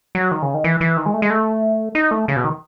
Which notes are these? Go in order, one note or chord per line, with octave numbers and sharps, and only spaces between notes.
F#3
D#3
C#3
D#3
E3
E3
D#3
G#3
A3
G#3
A3
D#4
A3
C#3
B2
D#3